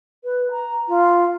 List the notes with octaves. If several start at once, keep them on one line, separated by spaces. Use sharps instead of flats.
B4
A#5
F4